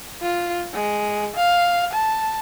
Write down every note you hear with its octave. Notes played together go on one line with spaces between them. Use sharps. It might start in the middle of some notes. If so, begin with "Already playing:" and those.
F4
G#3
F5
A5